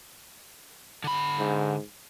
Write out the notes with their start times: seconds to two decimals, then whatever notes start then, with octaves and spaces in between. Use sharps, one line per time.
1.04 D3 B5
1.38 G#2